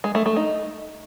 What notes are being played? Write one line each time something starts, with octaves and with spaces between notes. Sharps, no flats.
G#3
A3
A3
D#4